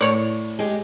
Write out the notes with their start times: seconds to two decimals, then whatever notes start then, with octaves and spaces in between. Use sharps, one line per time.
0.01 A2 C#5 D5
0.59 G#3 G4